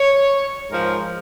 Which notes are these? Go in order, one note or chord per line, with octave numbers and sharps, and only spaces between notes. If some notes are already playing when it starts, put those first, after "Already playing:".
Already playing: C#5
G#2 F3 A#4